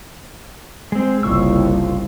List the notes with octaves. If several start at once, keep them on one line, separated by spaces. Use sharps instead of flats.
G#3 C4
F#1 C2 F4 C#6 E6